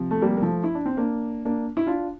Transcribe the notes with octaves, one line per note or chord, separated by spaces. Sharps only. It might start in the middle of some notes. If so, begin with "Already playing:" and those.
Already playing: C3 F3
A3
G3 A#3
A#3
F3 A3
E4
D4
C4
A#3 D4
A#3 D4
E4
D4 F4